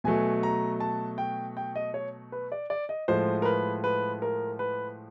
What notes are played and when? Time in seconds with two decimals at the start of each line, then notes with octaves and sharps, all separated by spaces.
0.04 B2 F#3 A3 G#5
0.43 A#5
0.80 A5
1.18 G5
1.57 G5
1.75 D#5
1.94 C#5
2.32 B4
2.52 D5
2.70 D5
2.89 D#5
3.08 A2 F3 G#3 C5
3.42 A#4
3.45 B4
3.84 B4
4.22 A#4
4.59 B4